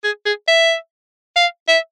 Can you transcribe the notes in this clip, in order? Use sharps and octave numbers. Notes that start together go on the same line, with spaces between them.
G#4
G#4
E5
F5
E5